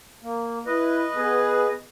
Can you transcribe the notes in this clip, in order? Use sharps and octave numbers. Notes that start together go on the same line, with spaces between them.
A#3
E4 B4 D#5
B3 G#4